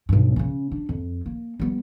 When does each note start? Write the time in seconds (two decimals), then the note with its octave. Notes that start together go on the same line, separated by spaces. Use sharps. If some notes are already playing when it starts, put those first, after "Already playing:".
0.09 B1 G2
0.36 C#3 C#4
0.72 D4
0.89 F2
1.26 A#3
1.60 G3 B3